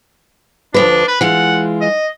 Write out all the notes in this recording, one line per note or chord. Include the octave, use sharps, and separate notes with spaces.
D2 F3 D4 B4
B4
E3 G#3 F4 F#5
D#5